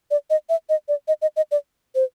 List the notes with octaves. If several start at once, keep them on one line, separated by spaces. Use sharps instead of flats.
D5
D#5
E5
D#5
D5
D#5
D#5
D#5
D5
C5